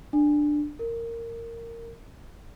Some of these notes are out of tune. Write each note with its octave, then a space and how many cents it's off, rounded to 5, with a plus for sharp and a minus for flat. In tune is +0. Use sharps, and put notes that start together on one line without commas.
D4 +10
A#4 -15